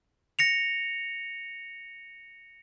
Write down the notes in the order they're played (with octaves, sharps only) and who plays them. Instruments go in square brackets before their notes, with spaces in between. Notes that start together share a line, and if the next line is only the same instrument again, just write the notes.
[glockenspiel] A#6 C#7 F7